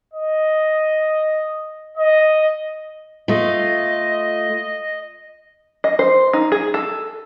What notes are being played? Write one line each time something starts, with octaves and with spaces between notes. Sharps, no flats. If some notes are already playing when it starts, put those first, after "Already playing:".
D#5
D#5
A3 F4 D#5
D#5
C5
D#4
G#4
A4